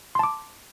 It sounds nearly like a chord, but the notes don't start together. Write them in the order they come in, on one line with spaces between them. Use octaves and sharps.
C6 A5 D6